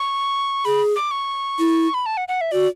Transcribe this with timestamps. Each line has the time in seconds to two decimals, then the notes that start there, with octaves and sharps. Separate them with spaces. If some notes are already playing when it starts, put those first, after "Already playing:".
Already playing: C#6
0.65 G#4 B5
0.96 D6
1.11 C#6
1.59 E4
1.94 B5
2.06 A5
2.17 F#5
2.28 F#5
2.41 E5
2.52 F#4 D5